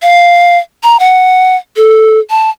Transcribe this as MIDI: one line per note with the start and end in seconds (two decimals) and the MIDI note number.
0.02 0.58 77
0.83 0.97 82
1.00 1.56 78
1.77 2.19 69
2.30 2.50 81